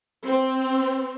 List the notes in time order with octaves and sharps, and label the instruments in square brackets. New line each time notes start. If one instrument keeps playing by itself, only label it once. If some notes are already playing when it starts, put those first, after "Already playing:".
[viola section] C4